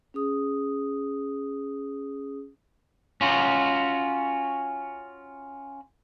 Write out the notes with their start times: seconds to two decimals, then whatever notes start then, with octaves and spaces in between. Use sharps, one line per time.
0.14 C#4 G#4 D#6
3.21 C#4 F4 F#4